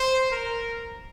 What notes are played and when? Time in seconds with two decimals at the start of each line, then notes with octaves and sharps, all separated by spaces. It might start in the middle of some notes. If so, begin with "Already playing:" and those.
Already playing: C5
0.31 A#4